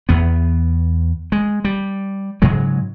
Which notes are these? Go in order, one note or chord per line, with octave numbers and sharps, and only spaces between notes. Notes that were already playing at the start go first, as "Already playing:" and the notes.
E2 B3
G#3
G3
G#2 C#3 F#3 G#3